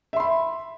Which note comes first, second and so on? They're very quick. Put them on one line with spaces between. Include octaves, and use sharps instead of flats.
E5 C6 B5